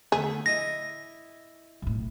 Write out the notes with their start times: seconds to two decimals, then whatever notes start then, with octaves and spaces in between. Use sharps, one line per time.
0.12 D3 A3 B3 G#4
0.46 E4 D#5 E5 A#6
1.82 B1 A2